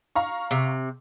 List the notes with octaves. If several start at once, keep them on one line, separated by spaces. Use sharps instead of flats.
F5 A#5 C#6
C3